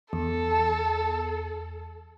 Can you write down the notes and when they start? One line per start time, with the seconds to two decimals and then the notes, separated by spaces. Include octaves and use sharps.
0.13 E2 A4